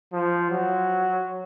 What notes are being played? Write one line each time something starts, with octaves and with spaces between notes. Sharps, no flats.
F3
F#3